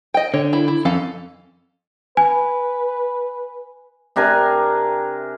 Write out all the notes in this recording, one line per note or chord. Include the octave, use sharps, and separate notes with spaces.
D#5 G5
D3 C#5
E4
E4
F2 C#4 A4 F5
B4 G#5
C3 D4 A#4 G#5